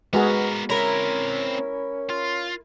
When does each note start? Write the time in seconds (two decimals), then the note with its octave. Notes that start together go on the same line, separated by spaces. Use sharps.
0.13 G#3 B3 F#4 G#4 A#4 B4
0.70 C4 C#4 E4 A#4 A#5
2.10 F4